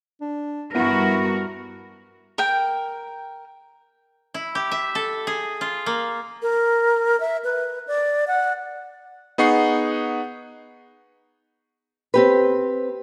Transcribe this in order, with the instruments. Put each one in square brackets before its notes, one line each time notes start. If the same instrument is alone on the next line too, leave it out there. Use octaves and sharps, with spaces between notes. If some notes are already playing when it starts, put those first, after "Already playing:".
[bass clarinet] D4
[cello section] G2 F#4 A#4 [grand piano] B3 [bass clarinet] E4
[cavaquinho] A#4 G5
[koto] E4
G4
E5
A4
G#4
F4
A#3
[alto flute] A#4
E5
B4
D5
F#5
[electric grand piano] B3 D#4 G#4 F#5 C#6 C7
[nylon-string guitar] C4 G4 B4